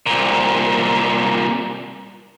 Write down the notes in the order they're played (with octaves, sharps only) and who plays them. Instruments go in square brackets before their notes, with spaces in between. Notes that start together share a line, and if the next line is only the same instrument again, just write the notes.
[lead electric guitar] C2 A#2